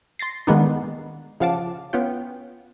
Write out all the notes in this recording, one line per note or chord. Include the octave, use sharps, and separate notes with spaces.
C6 A6 A#6 C7
D#3 G#3 A#3 B3 D4 D#4
C#3 F3 F5 F#5 A5 D6
B3 C#4 F4 G5